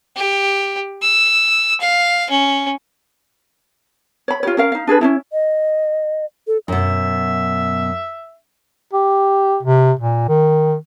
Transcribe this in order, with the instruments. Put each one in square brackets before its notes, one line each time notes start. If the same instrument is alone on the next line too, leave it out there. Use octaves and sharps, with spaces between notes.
[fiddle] G4
E6
F5
C#4
[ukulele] C#5 B5
F4 G4 C#5
C#4 A#4 F5
D#4 F5
D4 G#4 A4 B4
C#4 D4 E4
[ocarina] D#5
A4
[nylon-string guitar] F#2 B2 [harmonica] E5
[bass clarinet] G4
C3
A#2
D#3